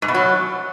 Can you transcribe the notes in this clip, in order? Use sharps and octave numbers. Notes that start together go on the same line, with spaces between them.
G#2
B2
F#3